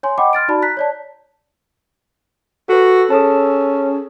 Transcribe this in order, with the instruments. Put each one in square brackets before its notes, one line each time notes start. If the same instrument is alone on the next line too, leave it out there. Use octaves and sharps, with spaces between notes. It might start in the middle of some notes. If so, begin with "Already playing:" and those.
[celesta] C#5 G#5 C6
D#5 F#5 G5 B5 D6
C6 F6 A6 D7
D#4 F#4 D5 A5 B5
A#5 F#6 B6
C#5 D5 A5
[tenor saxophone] F#4 [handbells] A4 B4
[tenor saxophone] C#4 [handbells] G#4 A4 A5